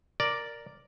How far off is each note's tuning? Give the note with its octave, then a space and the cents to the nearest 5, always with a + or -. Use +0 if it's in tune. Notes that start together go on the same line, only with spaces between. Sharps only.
A#4 +0 D5 +0